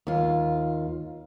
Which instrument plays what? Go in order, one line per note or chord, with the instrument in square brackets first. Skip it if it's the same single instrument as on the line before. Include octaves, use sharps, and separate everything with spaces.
[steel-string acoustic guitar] D#2 F4